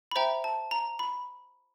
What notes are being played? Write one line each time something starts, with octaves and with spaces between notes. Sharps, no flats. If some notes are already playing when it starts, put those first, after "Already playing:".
B5
C5 E5 G5 A#5
A5
A#5
B5